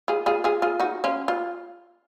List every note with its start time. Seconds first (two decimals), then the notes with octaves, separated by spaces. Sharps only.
0.08 F4 G#4
0.26 F4 G#4
0.44 F4 G#4
0.62 F4 G#4
0.80 D#4 F#4
1.04 C#4 F4
1.28 F4